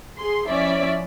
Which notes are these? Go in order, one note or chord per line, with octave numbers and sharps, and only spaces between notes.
G#4 C6
F3 C#4 E4 C#5 D5 E5